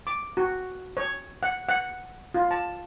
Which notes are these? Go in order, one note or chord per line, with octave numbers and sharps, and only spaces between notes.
D6
F#4
C#5
F#5
F#5
F4
A5